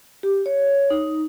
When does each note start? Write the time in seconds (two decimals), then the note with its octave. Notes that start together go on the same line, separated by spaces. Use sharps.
0.23 G4
0.46 C#5
0.90 D#4